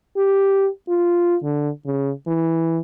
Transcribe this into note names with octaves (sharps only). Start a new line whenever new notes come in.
G4
F4
D3
C#3
E3